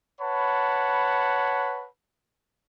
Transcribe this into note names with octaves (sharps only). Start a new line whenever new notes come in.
B4 C#5 F#5 A5 B5